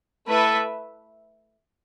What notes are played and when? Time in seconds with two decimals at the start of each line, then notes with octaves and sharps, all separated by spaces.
0.27 A3 E4 A4 B4 E5